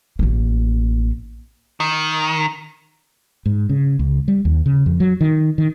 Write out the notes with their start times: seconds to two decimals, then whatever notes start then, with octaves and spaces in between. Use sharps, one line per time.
0.19 A1 A#3
1.80 D#3
3.46 G#2
3.69 C#3
3.99 C#2
4.28 G3
4.45 D#2
4.66 C#3
4.86 F2
5.00 F#3
5.21 D#3
5.58 D#3